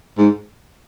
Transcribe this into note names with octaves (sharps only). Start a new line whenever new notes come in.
G#2